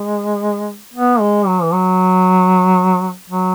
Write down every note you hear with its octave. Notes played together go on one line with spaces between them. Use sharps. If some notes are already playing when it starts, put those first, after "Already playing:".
Already playing: G#3
B3
G#3
F#3
E3
F#3
F#3